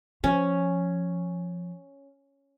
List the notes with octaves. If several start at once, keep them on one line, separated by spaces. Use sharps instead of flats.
F3 C#4